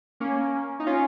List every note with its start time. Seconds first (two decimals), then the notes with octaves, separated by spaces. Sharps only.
0.20 A#3 C#4
0.80 D#4
0.86 C#4 F4